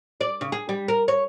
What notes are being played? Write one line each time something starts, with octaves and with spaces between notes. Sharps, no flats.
D5
C#3
G#4
G3
A#4
C#5